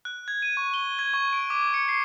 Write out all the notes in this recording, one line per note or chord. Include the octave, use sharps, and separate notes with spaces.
F#6
G#6
D#7
C#6
G7
G#6
C#6
D7
D6
C#7
C7